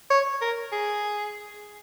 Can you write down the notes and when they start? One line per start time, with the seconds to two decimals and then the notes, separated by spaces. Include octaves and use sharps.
0.10 C#5
0.41 A#4
0.72 G#4